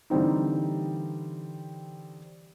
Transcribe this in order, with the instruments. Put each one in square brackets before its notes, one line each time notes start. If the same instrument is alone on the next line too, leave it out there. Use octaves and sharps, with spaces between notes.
[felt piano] D3 E3 G3 C4 D#4